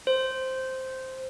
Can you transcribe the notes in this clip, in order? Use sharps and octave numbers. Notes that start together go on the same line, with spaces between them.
C5